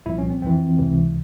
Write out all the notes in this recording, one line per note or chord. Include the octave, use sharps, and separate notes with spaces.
C2 A#2 F3 E4
C#4
C4
F2 E3 C4
C#2 C3 E3